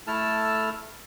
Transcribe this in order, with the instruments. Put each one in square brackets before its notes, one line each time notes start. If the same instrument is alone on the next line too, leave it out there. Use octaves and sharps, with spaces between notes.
[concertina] A3 E4 A4 A5 E6 F6